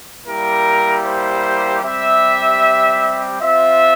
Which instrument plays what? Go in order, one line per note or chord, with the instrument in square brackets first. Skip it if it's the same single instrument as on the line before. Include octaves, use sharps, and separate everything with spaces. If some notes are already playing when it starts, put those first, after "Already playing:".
[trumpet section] G3 A#3 E4 G4 A#4
C5
G3 C4 G4 E5
C4 F4 E5